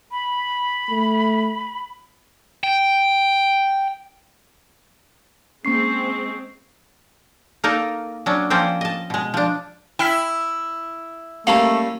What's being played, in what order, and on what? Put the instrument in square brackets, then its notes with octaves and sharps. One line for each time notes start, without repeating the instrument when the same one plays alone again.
[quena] B5
[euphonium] A3
[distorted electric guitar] G5
[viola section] G#3 C4 [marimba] A#3 C#4 [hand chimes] C#6 C7
[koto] A#3 D#4 A4 A#4 D5
F#3 C#4 D4
F3 A#3 C4 C#4 C5 D5
D#5 A5
B2 G#3
F3 D4
[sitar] E4 [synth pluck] G5 F6 B6
[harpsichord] G3 A#3 C#4 [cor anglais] A3 [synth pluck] F5 A5 A#5